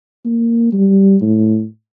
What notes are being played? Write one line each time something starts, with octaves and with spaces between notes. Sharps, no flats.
A#3
G3
A2